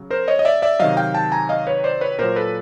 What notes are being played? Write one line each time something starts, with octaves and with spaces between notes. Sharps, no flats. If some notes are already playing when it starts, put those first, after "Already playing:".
Already playing: C#3 F#3
A#4 C5
C#5 D#5
D#5
D5 E5
D5 E5
C3 D#3 F#3 D#5 F5
F5 G5
G5 A5
G#5 A#5
D#5 F5
B4 C#5
C5 D5
B4 C#5
A#2 F#3 A#4 C5
A4 B4